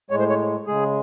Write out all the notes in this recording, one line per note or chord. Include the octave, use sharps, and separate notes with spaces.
A2 G#3 C#5
C5
C#5
C#3 G#3 G#4